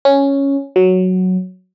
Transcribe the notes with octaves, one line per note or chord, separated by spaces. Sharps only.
C#4
F#3